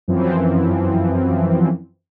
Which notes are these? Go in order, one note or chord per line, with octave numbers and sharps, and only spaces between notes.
F#2 E3 F3 C4